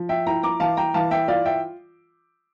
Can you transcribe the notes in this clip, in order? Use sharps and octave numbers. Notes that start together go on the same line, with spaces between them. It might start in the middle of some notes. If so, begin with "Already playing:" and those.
Already playing: F3
E5 G5
E4 G5 A#5
A#5 D6
E3 F5 A5
G5 A#5
E3 F5 A5
E5 G5
F4 D5 F5
E5 G5